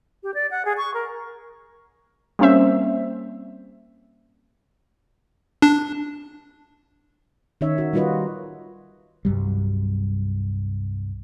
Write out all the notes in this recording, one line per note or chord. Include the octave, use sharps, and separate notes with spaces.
G4
D5
F#5
G#4
C#6
A#4
G3 A#3 C4 C#4 C5 E5
D4
D#3 C#4 D#4 C#5 E5
F#4
G3 D#4 F4 F#4 B4 D#5
C2 G2 F#3 G3